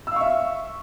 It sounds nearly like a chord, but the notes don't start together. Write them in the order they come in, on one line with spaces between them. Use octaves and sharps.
E6 F5 C#6 E5